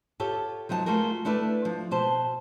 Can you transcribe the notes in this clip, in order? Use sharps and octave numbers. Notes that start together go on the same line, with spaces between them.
F4 G4 A4 C#5
F3 F#3 D#4 F#5 A5
A3 F4 F#4 G#4 A#4
A3 D4 E4 A4 B4
F3
B2 C5 A5